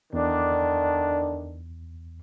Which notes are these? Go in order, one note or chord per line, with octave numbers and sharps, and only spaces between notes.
E2 D3 D#3 D4